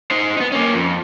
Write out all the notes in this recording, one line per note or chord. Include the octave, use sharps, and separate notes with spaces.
D#4 C5
B3 D#4
A#3 C#4
F2